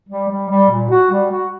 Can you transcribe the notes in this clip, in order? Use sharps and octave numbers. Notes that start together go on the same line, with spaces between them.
G3
G3
G3
A#2
F#4
G3
F#4